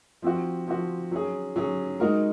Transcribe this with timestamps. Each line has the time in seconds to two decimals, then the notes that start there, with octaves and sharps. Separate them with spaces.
0.22 F3 C4 F#4
0.67 F3 C4 F#4
1.11 F#3 C#4 G#4
1.56 F#3 C#4 G#4
2.00 G#3 D#4 F#4 A#4